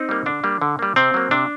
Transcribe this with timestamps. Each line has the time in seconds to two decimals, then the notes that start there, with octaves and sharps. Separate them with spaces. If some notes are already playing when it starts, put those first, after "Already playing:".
Already playing: C4 D#4
0.09 G3 A#3
0.26 D3 D4
0.44 G3 A#3
0.62 D3
0.79 G3 A#3
0.96 C3 C4
1.14 F#3 A#3
1.31 C3 D4